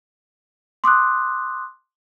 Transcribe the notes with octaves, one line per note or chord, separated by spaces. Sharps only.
C6 D6 D#6 F#6